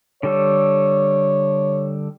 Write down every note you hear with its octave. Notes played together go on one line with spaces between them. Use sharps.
D3 G3 A4 C#5